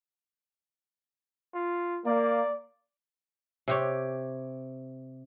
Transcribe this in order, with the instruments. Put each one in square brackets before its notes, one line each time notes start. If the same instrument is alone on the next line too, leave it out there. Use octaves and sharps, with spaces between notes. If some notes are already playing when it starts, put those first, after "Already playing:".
[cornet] F4
[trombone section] A#3 [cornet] D5
[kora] C3 G4 C#5